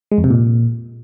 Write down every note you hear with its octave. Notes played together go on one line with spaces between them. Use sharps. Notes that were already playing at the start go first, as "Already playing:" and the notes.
G#3
F2
C3
A#2